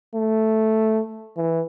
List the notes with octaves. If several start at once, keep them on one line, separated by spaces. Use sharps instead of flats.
A3
E3